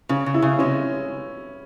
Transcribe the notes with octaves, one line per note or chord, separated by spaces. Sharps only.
C#3 C#4
C#3
E4
C#3
G#3 C#4